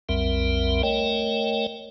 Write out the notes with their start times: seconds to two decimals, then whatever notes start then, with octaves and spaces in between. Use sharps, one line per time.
0.09 B1 F2 G3 C4 A#4 E5
0.83 A3 A#4 C#5 D#5 G5